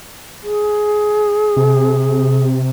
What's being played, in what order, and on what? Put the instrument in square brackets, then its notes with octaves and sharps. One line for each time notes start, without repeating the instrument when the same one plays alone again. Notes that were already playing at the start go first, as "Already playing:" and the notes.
[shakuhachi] G#4
[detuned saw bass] C3